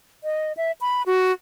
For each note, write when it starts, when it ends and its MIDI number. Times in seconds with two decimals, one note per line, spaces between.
0.24 0.53 75
0.57 0.72 76
0.81 1.03 83
1.06 1.32 66